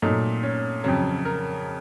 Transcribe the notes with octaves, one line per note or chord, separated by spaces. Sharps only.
A#2 F#3 A3 D#4
C#4
F2 C#3 F#3
A#4